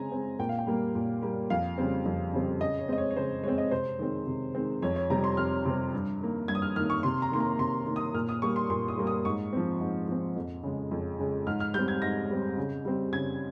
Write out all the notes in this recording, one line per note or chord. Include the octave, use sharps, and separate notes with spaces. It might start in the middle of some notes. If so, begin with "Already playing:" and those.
Already playing: C#3 G#3 C4 G#5 A#5
G#3 C4
A#2 G5
F5
G5
G3 A#3
A#2
G3 A#3
F2 F5
C#3 G3 C4
F2
C#3 G3 C4
C#3 D#5
C#5
G#3 C4 D#5
C#5
C#5
C#3 C5
G#3 C4 C#5
D#5
C3 C5
D#3 G#3 C4
C3
D#3 G#3 C4
F2 C#5
C#5
C3 G3 C4 A#5
C6
F2 F6
C3 G3 C4
G2
D#3 A#3
G2 G#6
D#6
F6
D#3 A#3 F6
C#6
C3 C6
A#5
D#3 A#3 C6
A#5
C3 C6
D#3 A#3
D#6
A#2 F6
D#6
G3 A#3 C#6
C6
A#2 C6
D#6
G3 A#3
D#6
G#2 C#6
F3 C4
G#2
F3 C4
F2
C#3 G#3
F2
C#3 G#3
G#2 F6
F6
G3 C4 G6
G#6
G#2 A#6
G3 C4
C#3
G3 C4
C#3 G#6